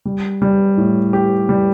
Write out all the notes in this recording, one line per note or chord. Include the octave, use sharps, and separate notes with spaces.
G3
G3
A2
G4
G3